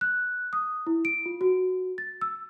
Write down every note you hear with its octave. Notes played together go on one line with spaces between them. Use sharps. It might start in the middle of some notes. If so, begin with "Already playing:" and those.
F#6
D#6
E4
D7
F4
F#4
A6
E6